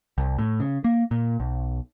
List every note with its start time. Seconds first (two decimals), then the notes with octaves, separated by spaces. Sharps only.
0.18 C2
0.39 A2
0.60 C#3
0.84 A#3
1.11 A#2
1.40 B1